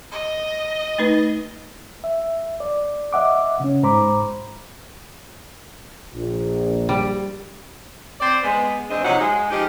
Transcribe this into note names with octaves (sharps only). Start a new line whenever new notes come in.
D#5
A3 D#4 B4
E5
D5
D#5 E5 F#5 D6
C#3 C#4
G#2 C5 A#5 B5 D6
A#1
G3
C4 C5 D5
G#3 B3
E2 G#3 C4 D4 D#5
C3 F3 F#3 D#4 F#5
G#3
F3 G#3 D#4 G4